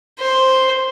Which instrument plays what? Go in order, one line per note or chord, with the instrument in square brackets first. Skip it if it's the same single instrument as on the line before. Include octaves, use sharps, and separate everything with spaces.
[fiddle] C5